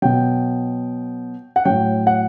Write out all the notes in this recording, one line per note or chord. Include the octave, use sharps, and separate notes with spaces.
B2 F#3 G5
F#5
A2 F#3 G5
F#5